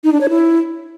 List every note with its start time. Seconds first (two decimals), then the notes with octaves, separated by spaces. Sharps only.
0.04 D#4
0.12 D4
0.21 C#5
0.29 E4